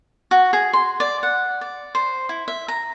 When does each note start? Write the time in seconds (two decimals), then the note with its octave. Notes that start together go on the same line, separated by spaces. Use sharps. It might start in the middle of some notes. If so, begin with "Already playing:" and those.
0.31 F#4
0.53 G#4
0.73 C6
1.00 D5
1.23 F#5
1.61 D5
1.95 C5
2.29 E4
2.48 E5
2.68 A#5